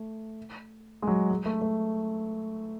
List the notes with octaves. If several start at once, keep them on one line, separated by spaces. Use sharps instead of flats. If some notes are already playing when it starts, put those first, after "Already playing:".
Already playing: A3
G#3
F#3
G#3
A3
A3